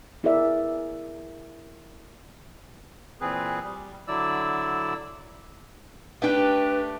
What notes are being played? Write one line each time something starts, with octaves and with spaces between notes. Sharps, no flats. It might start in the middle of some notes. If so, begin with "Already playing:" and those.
B3 E4 G#4 A#4 D5 E5
A#2 E3 C4 G#4 B4
G3
D3 F#3 E4 D5 E6
A3 D4 G4 B4 G5